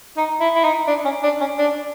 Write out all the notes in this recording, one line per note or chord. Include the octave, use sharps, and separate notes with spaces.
D#4
E4
E4
D#4
D4
C#4
D4
C#4
D4